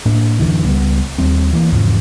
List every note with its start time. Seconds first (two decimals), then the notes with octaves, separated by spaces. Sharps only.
0.06 A2 A#3 D4
0.39 F#2 A2 D3 E3
0.65 C#2 G3 B3
1.18 D#2 G3 C4
1.53 E3 A#3
1.72 E2 G#2 C#3 F3